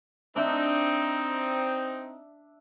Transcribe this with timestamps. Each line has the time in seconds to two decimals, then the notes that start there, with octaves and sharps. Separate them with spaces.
0.36 C4 D4 D#4 E5